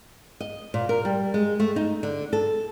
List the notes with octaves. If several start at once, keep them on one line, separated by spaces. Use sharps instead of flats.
D#5
A#2
A#4
G3
G#3
A3
D#4
D3
A4